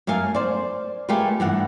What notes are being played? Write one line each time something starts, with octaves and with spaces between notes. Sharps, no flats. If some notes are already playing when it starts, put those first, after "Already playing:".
F#2 A3 A#4 F5 G#5
C5 D5
A3 F4 G4 G#4 A#4 B4
G2 E3 F#5